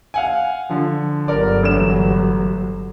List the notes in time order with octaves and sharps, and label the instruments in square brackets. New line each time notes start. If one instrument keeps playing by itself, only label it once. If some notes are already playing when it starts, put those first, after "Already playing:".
[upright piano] F5 F#5 G#5
D3 F3
[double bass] G1 F#3 [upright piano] A#4 D5
[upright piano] A1 E7